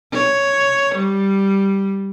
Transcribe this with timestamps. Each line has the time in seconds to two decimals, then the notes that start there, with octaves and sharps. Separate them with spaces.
0.13 C#5
0.95 G3